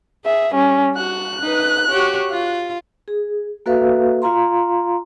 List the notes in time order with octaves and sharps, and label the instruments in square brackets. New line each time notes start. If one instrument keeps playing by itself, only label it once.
[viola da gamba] G#4 [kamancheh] E5
[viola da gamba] G3 [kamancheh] C#4
[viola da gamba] F#4 [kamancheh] F#6
[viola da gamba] D#4 B4
F#4 G4 C#5
F4
[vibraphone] G#4
A#3 F#4 A4 B4 E5 F5
F4 F5 A#5 C6